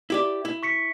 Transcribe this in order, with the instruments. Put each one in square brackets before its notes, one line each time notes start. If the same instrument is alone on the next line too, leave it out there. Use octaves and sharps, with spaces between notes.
[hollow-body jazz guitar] E4 G4 D5
E4
[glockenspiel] C#6 B6 C#7